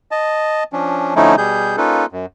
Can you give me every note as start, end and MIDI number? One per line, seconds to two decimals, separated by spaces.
0.11 0.64 75
0.11 0.64 81
0.73 1.14 53
0.73 1.14 61
0.73 1.14 62
1.16 1.36 50
1.16 1.36 53
1.16 1.36 57
1.16 1.36 61
1.16 1.36 63
1.16 1.36 64
1.38 1.76 47
1.38 1.76 55
1.38 1.76 68
1.38 1.76 91
1.77 2.06 58
1.77 2.06 61
1.77 2.06 63
1.77 2.06 65
1.77 2.06 69
1.77 2.06 71
2.12 2.26 42